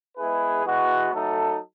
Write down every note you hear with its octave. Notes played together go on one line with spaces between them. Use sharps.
G#3 B3 E4 G#4 B4
E3 G#3 B3 F#4
F#3 A3 D#4 A4